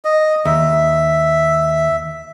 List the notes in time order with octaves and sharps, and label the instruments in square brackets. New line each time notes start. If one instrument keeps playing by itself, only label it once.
[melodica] D#5
[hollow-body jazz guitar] D#2 [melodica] E5